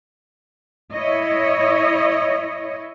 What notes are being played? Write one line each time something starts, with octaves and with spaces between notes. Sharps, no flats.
E4 C#5 D#5